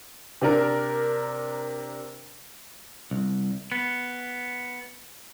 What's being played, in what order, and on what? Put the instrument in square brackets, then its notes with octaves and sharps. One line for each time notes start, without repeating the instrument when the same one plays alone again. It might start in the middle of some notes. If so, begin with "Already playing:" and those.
[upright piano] C3 D4 A#4
[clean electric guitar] C2
B3